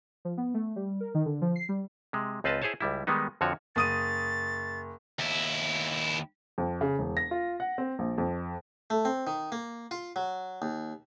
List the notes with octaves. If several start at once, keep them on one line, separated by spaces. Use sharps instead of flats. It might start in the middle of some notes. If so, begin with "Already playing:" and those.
F3
B3
A3
G3
A#4
D#3
D3
F3
C7
G3
C3 G#3
C#2 C4 F4 B4 D#5 A5
E4 G#4 C5 C#5 A5
C#2 G3 E4
D#3 G3 G#3 B3 D#4
F2 D3 F3 F#4 C#5
F#1 D#6 A6 D#7
D#2 E4
F2
C#3
E1
A#6
F4
F#5
C4
A#1
F2
A3
C4
D#3
A#3
F4
F#3
D#2